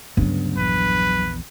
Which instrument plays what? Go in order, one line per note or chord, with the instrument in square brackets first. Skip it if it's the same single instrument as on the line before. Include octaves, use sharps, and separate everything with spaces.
[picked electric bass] D2 C#3 B3 [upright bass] G2 F#3
[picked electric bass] A#1 E2 [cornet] B4